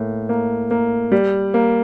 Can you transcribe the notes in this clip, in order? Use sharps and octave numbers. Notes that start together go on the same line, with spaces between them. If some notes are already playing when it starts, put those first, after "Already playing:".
Already playing: A2 A#3
A#3
A#3
G3
A#3